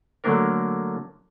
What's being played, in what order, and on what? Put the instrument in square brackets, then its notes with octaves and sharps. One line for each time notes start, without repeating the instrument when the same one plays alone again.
[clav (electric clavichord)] D3 F#3 A3 A#3 D4 A#4